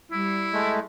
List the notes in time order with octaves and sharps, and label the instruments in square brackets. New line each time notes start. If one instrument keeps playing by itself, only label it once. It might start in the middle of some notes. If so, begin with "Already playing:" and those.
[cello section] G3 [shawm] E4
[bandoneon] G#3 A3